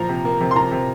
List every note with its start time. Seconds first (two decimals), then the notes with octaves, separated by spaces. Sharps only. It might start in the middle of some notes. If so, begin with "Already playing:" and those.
Already playing: A#2 F3 A#5
0.09 C3
0.25 A#3
0.41 C3
0.51 C6
0.56 F3 A#5
0.72 C3